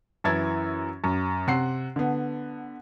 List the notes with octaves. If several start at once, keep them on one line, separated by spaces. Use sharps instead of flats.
F#2 E3 E4 G#6 A6
F#2
C3 F#5 C7
D3 B3